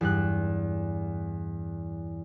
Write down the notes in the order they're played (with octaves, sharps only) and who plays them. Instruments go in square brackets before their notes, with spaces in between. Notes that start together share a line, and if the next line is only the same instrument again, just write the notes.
[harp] E2 G2 F#6